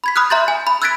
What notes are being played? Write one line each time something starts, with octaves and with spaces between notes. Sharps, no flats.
B5 G#6 B6
B5 D#6 F6 F#6
E5 A#5 C6 G6 A6
G#5
B5
E6 F#6 G#6 A6 B6 D7